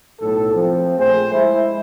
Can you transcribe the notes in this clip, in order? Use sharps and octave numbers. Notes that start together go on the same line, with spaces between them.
B1 A2 A4
F3 C4
A#1 A3 G#4 C5
G#3 E4